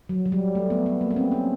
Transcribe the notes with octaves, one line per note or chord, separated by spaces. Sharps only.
F#3
F#3
G3
A3
B3
B3
A#3
B3
C4
C#4